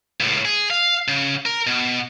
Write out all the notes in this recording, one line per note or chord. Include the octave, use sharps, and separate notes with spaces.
C#2 A2
G#4
F5
C#3
A#4
B2